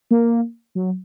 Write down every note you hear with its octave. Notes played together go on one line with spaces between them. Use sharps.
A#3
F#3